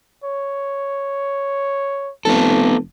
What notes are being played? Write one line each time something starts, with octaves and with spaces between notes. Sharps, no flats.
C#5
F1 B3 A4